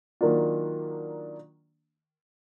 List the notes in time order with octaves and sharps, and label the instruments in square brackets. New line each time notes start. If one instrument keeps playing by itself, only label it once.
[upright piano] D#3 F#3 A#3 D4 F4